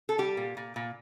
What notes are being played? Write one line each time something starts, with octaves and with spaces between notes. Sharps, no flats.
A4
G3 G4
A#2
A#2
A#2